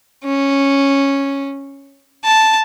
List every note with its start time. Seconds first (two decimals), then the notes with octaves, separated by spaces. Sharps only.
0.24 C#4
2.24 A5